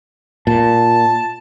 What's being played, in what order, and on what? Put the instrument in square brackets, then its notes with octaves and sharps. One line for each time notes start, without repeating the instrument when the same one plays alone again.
[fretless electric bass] A#2 [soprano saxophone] A5